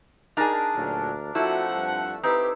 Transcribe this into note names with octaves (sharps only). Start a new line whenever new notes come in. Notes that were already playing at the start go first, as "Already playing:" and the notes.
D4 D#4 G#4 A#4 A5
D2 A#2 F#3
F3 A3 C4 E4 F#4 F#5
G2
C4 D#4 E4 G4 B4